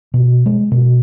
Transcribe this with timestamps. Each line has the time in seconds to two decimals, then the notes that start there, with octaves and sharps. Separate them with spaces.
0.14 B2
0.46 G#3
0.72 B2